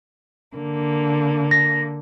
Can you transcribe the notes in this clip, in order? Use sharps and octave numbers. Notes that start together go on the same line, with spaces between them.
D3 A#3
A#6